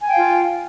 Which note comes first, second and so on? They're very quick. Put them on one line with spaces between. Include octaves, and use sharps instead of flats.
G#5 G5 F5 F4